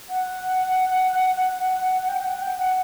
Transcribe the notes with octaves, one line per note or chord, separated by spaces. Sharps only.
F#5
G5
F#5
G5
F#5